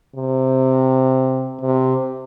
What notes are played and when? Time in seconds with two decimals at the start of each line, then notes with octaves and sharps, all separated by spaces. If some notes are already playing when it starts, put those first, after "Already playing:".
0.15 C3
1.61 C3